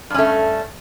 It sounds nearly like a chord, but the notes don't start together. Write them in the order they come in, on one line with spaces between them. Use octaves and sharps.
G2 C#4 A3